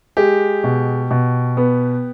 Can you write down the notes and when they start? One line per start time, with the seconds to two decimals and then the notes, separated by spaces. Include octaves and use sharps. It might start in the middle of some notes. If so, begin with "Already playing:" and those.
0.17 G#3 G4
0.64 B2
1.11 B2
1.57 B3